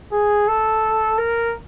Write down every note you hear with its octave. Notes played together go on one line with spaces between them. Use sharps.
G#4
A4
A#4